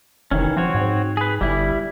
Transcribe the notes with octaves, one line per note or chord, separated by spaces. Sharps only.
F1 D#3 E3 C#4
F3 C4 F#4 C#5
G#2
G#4 B4
G1 G3 E4